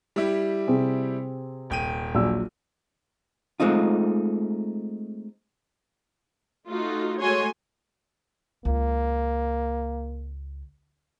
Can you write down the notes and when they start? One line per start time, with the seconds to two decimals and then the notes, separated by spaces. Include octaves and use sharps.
0.16 G3 E4 G4
0.67 C3 C4 G#4
1.70 D#1 G5 D#7
2.15 A#1 F#3 E6
3.60 G#3 A3 C4 D#4 F4
6.68 A3 D#4 F4 F#4
7.20 G#3 A3 F#4 C#5 G#5 C6
8.65 C#2 A#3